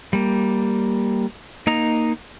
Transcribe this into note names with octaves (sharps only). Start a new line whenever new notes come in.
G3 A#3
A#3 D#4 D#5 A#5